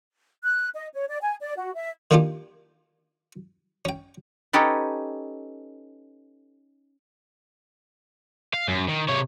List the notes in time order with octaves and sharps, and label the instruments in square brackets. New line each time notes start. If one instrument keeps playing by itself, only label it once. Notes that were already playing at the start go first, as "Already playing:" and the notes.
[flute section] F#6
D#5
C#5
D5
G#5
D5
F#4
E5
[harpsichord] D#3 A#3 D4 D#4 F4 G4
C#4 G5
[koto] C#4 D#4 G4 A4 B4
[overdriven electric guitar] F5
F#2
D#3
C3 C#5